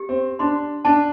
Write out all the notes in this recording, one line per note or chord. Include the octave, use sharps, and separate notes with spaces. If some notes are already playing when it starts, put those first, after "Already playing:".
Already playing: G4
C4
D4 C6
D4 A5